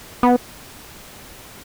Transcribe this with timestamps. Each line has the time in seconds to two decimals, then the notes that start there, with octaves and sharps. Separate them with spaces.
0.23 B3